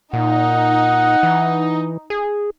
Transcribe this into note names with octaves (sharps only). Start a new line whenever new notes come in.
A#2 D#4 F#5
E3
G#4